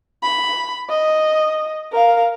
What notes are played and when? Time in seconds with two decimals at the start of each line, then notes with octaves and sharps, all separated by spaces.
0.23 B5
0.89 D#5
1.92 A#4 F5